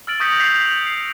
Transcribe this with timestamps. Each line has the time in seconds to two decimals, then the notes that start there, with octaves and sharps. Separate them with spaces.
0.07 E6 F6 A6 D7 F#7
0.20 C#6 D#6 G6 A#6 B6 C#7
0.40 G6 B6 C7 F7 F#7
0.66 D#6
0.86 C7